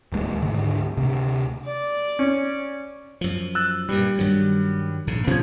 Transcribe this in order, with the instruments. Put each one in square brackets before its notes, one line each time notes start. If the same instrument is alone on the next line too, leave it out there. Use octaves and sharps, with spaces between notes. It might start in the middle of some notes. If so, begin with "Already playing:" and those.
[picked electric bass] D1 D#2 G#3
D2 G#2 D3
D2 C3
[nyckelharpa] D5
[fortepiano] C#4
[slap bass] F#2 F3
[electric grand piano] E6 F#6 A6
[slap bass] G2 A#2 [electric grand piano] G3
[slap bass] G2 D#3 F#3
A#1 G#2 C#3
[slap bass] A#2 C#4 [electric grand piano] F3 G#6